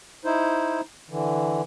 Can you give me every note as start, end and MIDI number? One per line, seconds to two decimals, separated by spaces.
0.25 0.81 63
0.25 0.81 64
0.25 0.81 72
1.10 1.62 50
1.10 1.62 52